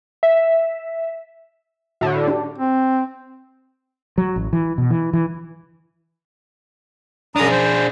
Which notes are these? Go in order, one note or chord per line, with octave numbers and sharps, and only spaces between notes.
E5
A2 D3 F#4
D4 G4
C4
F#3
A1
E3
B2
E3
E3
F#2 D4 G#4 A#5 D#6
C5